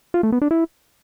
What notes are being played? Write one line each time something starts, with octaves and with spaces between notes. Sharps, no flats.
F4
A3
B3
D4
E4